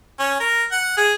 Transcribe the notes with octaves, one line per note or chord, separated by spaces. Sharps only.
C#4
A#4
F#5
G#4